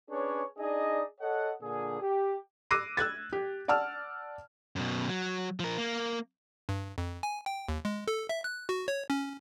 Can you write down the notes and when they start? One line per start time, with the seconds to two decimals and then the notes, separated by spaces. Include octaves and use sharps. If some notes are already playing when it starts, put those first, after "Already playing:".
0.11 C#4 D4 G#4 B4 C#5
0.59 D4 D#4 G#4 D5 D#5
1.21 A4 C#5 D#5 F#5
1.62 A#2 D3 G#4
2.01 G4
2.71 D6 E6 F#6 A#6 C7 D#7
2.97 E6 F#6 G#6 A6
3.32 G4
3.68 D5 F#5 A5 E6 F6
4.76 F#2 B2
5.09 F#3
5.60 F3 A#4
5.78 A#3
6.69 G2
6.98 F2
7.23 G#5
7.46 G5
7.69 D#2
7.85 G#3
8.08 A4
8.29 E5
8.44 F#6
8.69 F#4
8.88 C#5
9.10 C#4